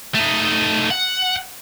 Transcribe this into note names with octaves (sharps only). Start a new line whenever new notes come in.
A3 D#4
F#5